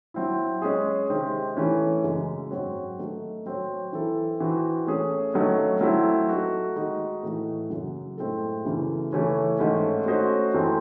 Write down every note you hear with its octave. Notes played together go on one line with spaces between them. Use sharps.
F#3 C4 E4
G#3 C#4 G#4
C3 D#3 G#3 C4
E3 A3 C#4
F#2 C#3 G#3
G#2 F#3 C4 F#4 C#5
D#3 A3 D#4
F#3 C4 F#4 C#5
E3 C4 E4 A4
E3 C4 F#4
A3 C#4 G#4
D#3 F#3 A3 C#4
F#3 A3 C4 E4
A3 D#4 F#4
D#3 G#3 D#4 F#4
A2 E3 A3
F#2 C#3 F#3
A2 G#3 C4 E4 A4
F#2 C#3 E3 A3
C#3 E3 A3 C#4 E4
G#2 D#3 A3 C#4
A3 C#4 F#4 C5 D#5
F#2 E3 A3 C4